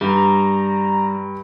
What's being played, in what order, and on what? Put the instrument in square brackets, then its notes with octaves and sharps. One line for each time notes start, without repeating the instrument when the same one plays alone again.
[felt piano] G2 [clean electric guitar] G3 [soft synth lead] A#5